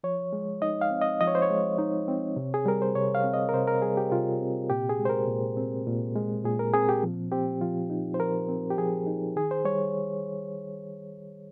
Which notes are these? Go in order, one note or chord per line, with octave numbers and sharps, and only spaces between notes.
F3 C#5
G#3
D#4 D#5
F5
C4
D#5
F3 D#5
C#5
C5
C#5
G#3
D#4
C4
C3
G#4
G3 A#4
C5
C3 C#5
F5
C4
D#5
A#4
C3 C5
A#4
G3 G#4
G4
C3 F4
C4
A#2 G4
G#4
G#3
C5
A#4
A#2
C4
A#2
G#3
A#2 G#4
A#4
C4 G#4
G4
F3
C4 G4
F3 F4
D#4
C5
F3 A#4
C4
G4
F3 G#4
D#4
D#3 G#4
C5
G3 C#5